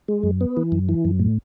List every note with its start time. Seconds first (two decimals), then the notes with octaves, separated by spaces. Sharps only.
0.08 G#3
0.23 F#2
0.41 B3
0.57 E3
0.72 F#2
0.89 E3
1.05 F#2
1.20 A2